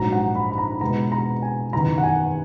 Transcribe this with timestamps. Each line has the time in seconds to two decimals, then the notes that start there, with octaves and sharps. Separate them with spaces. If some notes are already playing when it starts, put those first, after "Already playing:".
Already playing: A#1 G#2 F#3 A#5
0.13 F#5
0.35 B5
0.52 B5
0.58 A#5
0.81 E2 B2 G#3 A#5
1.12 A#5
1.42 G#5
1.73 F#1 E2 D#3 A#5
1.98 F#5
2.03 G#5